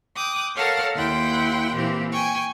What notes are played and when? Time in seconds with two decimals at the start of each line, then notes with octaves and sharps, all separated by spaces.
0.15 G5 D6 D#6 F#6
0.55 A4 A#4 C#5 F5 F#5 A5
0.93 D#2 E4 F#5 G5 C6
1.73 A#2 E3 C4 G4
2.12 G5 G#5 C#6